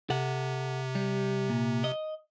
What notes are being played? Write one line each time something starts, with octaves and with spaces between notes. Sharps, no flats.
C3 A4 F#5
G3
A#2
D#5